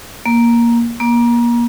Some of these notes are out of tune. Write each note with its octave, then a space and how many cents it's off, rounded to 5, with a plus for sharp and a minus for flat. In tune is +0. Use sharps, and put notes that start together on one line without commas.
A#3 +10
A#3 +30